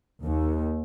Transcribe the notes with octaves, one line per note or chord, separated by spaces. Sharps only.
D#2